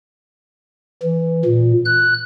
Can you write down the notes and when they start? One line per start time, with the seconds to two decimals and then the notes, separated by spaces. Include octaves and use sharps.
1.03 E3
1.45 A#2
1.86 F#6